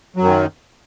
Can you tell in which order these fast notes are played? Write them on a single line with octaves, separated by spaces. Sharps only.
F#3 F#2 D#3